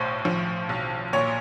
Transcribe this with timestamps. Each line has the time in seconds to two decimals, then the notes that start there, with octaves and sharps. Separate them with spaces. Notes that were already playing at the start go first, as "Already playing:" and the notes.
Already playing: B1 A2 C5
0.25 F3
0.69 B1
1.13 A#2 C#5